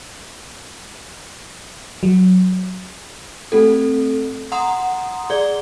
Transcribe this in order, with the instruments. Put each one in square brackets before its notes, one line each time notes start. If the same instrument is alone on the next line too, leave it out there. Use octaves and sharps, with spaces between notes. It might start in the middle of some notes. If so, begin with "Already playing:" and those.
[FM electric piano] F#3
[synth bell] A3 C4 A4
F#5 A#5 C6 D#6
G#4 D5 G#6 G7